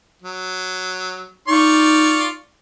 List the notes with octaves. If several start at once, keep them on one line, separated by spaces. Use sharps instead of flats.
F#3
D#4 F4 D5 C#6